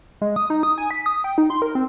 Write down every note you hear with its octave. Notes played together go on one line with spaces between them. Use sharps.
G#3
D#6
D#4
D#6
G#5
B6
D#6
G5
D#4
C6
A#4
C4